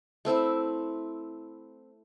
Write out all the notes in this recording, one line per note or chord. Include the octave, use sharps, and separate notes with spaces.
A3 C4 E4 E5